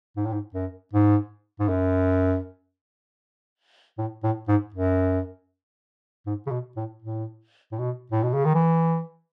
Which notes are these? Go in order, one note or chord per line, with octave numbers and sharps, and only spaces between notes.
G#2
A2
G#2
F#2
G#2
G#2
F#2
A2
A2
G#2
F#2
G#2
C#3
B2
A2
A2
A2
B2
A2
B2
C#3
D#3
E3